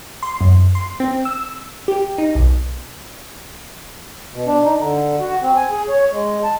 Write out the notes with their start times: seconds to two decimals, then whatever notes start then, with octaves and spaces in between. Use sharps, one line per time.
0.23 C6
0.41 F#2
0.75 C6
1.00 C4
1.25 E6
1.88 G4
2.18 D#4
2.35 B1
4.32 B2
4.46 D4
4.65 D#4
4.78 D3
5.20 F#4
5.42 C4
5.56 G#5
5.70 G#4
5.89 C#5
6.12 G#3
6.44 A5